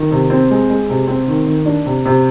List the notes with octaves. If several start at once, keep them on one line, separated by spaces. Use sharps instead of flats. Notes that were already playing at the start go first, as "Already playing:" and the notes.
Already playing: D#3
C3
C4
G#3
G#3
C3
C4
D#3
D#3
D4
C3
C3